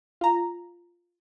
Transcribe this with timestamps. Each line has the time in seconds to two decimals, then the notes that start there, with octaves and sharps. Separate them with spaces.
0.21 F4 A#5